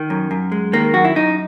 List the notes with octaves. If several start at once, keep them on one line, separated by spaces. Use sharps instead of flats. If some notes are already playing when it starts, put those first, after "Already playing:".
Already playing: D#3
F#2
F#2
G#3
D#3 A#3
F#2 F#4
E4
F#2 D#4